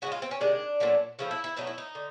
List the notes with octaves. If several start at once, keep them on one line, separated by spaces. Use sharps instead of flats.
C#3 E3 G#3 F#4
F4
C4
C#4
C3 D#3 G#3 D4
A#2 F#3 A3
C#3 F3 A3 E4
E4
E4
B2 F#3 A3 D#4
E4
D#4
D3